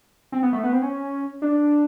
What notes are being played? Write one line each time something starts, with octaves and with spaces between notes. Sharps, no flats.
C4
B3
A3
B3
C4
C#4
D4